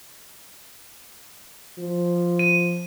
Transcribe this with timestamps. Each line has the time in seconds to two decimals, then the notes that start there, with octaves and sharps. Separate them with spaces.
1.79 F3
2.39 D#7